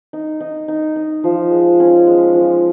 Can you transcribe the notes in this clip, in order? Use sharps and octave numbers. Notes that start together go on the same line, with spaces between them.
D#4
D#4
D#4
D#4
F3
G#3
C#4
G#3
F3